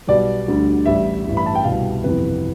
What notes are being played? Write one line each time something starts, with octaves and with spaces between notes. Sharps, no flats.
B1 B2 G3 D5
D2 D3 G3
A1 A2 G3 E5
A1 G2 E3 G3
B5
A5
G5
C2 B2 G3 F5
G1 F2 C3 E3 B4